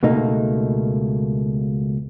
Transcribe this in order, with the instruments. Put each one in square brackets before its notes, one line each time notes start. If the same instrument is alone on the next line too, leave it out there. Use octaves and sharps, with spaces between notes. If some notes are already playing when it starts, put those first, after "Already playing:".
[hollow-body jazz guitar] C#2 B2 A3 A#3 D#4